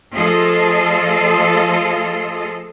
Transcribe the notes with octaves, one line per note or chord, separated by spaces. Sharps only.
F3 A3 F4 G#4 A4 D#5